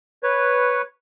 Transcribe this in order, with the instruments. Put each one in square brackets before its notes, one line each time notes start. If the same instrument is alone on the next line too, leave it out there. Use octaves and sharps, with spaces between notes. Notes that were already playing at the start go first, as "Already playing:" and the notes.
[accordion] B4 C#5